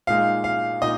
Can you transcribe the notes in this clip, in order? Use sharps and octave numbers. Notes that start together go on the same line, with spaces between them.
A#2 G#3 D#4 F5
F5
A#2 D#4 D#5